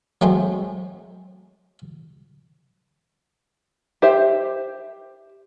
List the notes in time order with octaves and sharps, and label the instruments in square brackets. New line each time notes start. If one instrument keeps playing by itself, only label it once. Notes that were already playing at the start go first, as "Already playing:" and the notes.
[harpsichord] F#3 G#3 A3 C4 C5
[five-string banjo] G4 C5 E5